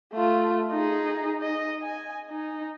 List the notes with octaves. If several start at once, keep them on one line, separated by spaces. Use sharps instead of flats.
A3 F4
D#4 G#4
D#5
G#5
D#4